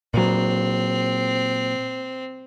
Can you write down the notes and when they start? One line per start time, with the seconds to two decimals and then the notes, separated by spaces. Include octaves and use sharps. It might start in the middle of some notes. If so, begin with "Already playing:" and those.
0.14 A#2 F#3 C4